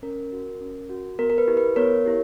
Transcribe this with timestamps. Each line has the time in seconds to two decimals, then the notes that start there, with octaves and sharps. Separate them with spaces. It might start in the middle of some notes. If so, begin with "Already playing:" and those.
0.02 C#4 A#4
0.32 F#4
0.61 C#4
0.90 F#4
1.19 B3 A#4
1.30 A#4
1.38 B4
1.48 E4 G4
1.57 B4
1.76 B3 A#4 C#5
2.06 E4 G4